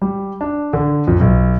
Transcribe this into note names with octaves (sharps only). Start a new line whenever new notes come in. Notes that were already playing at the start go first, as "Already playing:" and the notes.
G3
D4
D3
F2
B1